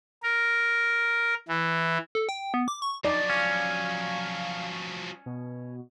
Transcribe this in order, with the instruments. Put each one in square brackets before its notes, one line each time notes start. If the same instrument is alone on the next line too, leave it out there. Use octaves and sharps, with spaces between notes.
[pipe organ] A#4
E3
[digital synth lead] A4
G5
B3
D6
C#6
[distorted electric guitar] F3 F#3 [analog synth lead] D#4 [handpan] D5
[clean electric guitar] C#4 [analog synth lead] F5
[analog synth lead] B2